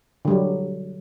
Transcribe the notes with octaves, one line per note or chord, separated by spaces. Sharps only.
D3 F#3 G3